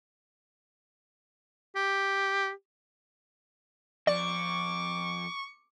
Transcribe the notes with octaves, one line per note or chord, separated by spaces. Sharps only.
G4
F2 F3 D5 C#6 D6